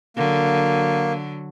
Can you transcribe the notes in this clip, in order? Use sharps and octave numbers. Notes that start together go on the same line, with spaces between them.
D3 F#3 A#3